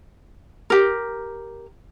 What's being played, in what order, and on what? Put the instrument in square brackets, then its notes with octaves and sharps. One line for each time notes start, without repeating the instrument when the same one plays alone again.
[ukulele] G4 A#4